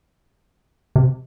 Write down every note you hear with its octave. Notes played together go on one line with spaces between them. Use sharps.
C3